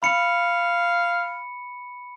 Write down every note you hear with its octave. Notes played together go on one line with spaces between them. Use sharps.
F5 B5 C#7